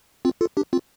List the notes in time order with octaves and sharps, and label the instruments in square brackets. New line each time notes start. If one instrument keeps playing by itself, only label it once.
[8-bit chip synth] C4 F4
F4 A4
D4 G4
C4 F4